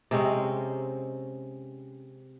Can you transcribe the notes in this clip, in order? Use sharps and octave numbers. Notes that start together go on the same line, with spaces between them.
C3 G#3 C4 C#4